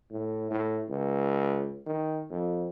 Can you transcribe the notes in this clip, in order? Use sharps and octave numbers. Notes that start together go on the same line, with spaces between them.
A2
A2
C#2
D#3
F2